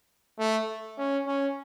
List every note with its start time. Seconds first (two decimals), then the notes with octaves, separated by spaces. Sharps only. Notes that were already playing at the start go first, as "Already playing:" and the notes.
0.39 A3
0.98 C#4
1.27 C#4